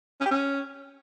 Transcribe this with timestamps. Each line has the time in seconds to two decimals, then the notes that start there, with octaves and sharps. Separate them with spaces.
0.21 C#4
0.26 G4
0.31 C#4